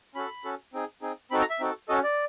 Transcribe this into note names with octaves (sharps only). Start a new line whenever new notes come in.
C#4 F#4 A4 B5
C#4 F#4 A4
C4 D#4 G#4
C4 D#4 G#4
C4 D#4 F#4 A4 B5
A#5
E5
C4 D#4 F#4 A4
C#4 F#4 A4 D#5
D5